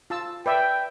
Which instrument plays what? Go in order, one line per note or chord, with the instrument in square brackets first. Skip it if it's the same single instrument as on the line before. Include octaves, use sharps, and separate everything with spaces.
[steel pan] F4 A5 E6
[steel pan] B4 D5 E5 [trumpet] G5